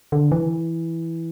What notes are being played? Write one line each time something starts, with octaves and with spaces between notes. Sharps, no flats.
D3
E3